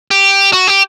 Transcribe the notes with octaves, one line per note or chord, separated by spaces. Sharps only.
G4
F#4
G4